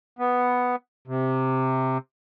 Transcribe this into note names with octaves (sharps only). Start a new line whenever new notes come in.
B3
C3